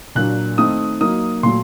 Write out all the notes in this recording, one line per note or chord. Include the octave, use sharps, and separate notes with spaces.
A#2 F#3 A#3 D4 F#6
D#3 A3 C4 D#4 D#6
F#3 A#3 D#4 D#6
A#2 F#3 A3 C6